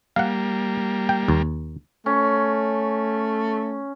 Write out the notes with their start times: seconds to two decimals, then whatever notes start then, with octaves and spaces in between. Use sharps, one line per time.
0.16 G3 A#3 F5 F#5
1.09 G5
1.28 D#2
2.06 A3 C#4